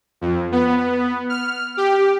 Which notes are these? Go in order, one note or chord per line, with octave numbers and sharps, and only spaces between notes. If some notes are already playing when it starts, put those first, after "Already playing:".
F2
B3
F6
G4